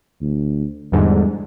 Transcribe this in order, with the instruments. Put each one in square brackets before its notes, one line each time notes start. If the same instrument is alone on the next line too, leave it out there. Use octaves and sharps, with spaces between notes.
[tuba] D2
[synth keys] E2 G#2 D3 [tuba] G3